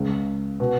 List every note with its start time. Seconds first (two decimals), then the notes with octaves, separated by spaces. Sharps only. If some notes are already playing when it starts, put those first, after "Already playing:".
Already playing: C#2 C#3
0.60 B2